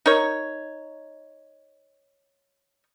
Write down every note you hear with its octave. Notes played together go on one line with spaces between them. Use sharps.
D#4 A#4 C#5